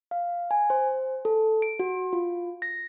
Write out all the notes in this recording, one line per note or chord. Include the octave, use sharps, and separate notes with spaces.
F5
G#5
C5
A4
D7
F#4
F4
A#6